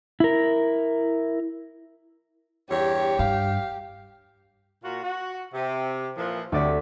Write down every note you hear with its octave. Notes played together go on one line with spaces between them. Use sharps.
E4 A#4
E2 G2 G4 C#5
G2 F5
A#2 F4 F#4
F#4
C3
A#2 E3 F3
D2 C3 D5 B6